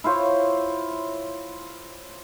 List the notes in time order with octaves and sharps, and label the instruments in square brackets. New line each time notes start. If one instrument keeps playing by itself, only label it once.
[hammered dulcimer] E4 F4 C5 C#5